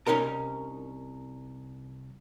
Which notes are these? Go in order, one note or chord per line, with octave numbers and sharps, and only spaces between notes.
C2 C#4 D#4 A#4 A#5